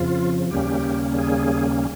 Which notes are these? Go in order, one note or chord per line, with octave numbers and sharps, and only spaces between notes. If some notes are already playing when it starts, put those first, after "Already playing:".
Already playing: F2 C#3 F3 F4
D#2 C#3 G3 A#3 C#4 G4
G#4